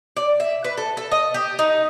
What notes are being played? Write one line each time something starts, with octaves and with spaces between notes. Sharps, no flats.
D5
E5
B4
A4
A4
D#5
G4
D#4